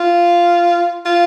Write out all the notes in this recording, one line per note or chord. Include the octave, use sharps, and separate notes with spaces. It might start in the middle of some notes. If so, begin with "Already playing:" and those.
Already playing: F4
F4